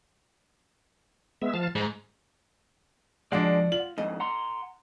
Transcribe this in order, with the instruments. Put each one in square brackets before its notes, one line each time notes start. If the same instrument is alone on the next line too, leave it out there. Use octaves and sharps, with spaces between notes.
[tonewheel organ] G#3 B3 E5
F3 F5 A5
[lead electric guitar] G#2 [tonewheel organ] A#5 B5
[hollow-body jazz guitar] C#2 F3 F#4 [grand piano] G#3 D4 [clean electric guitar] D5 F#5
[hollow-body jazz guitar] F4 [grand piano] F#7
[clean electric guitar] F2 G#2 [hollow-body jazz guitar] D#5
[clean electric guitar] F#5 A#5 C6